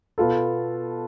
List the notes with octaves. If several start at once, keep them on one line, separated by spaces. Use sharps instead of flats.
B2 B3 F4 A4